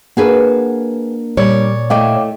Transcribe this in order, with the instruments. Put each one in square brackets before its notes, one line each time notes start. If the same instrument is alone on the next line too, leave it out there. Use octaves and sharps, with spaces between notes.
[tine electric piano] A#3 D4 A#4 [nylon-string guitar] F#4 G#4 B4
[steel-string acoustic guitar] A#2 C#5 D5 [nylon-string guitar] G3
[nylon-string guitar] A3 E4 D#5 [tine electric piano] F5 G5 D6